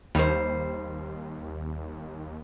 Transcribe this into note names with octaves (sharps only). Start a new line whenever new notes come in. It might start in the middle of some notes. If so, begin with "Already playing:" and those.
D#2 G3 C5